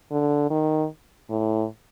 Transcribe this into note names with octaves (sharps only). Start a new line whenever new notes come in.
D3
D#3
A2